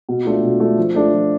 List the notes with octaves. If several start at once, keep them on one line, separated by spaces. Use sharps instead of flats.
B2
A3 D4 F4
B2
A3 D4 F4
F3
A3 D4 F4 A4
F3